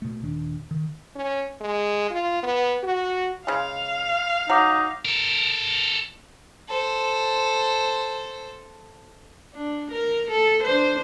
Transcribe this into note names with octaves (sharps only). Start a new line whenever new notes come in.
B2 A3
D#1 D#3 D4
D#3
C#4
G#3
F4
B3
F#4
C#3 G#3 F5
F#3 D#4 F#5 D6
A4 A#4
A4 C5
D4
A#4
A4
D4 C5